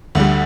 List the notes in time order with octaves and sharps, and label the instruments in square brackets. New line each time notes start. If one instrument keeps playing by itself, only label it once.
[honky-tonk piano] D2 D3 G3